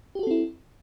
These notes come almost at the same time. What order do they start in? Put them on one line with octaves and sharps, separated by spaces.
G4 F#4 A4 C4 E4